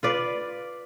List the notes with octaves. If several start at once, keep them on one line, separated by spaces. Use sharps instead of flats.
F4 B4 D5